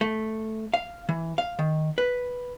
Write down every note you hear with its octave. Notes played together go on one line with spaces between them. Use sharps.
A3
F5
E3
F5
D#3
B4